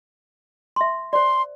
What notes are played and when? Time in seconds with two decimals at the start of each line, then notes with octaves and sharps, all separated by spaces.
0.76 E5 C6
1.13 C5 D5 C6